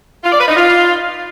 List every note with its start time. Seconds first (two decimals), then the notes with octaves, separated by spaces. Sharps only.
0.24 F4
0.32 D5
0.40 B4
0.48 D#4
0.57 F4